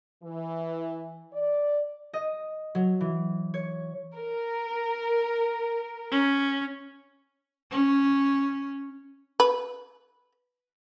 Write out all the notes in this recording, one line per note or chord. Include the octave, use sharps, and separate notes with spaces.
E3
D5
D#5
F#3
E3
C#5
A#4
C#4
C#4
B4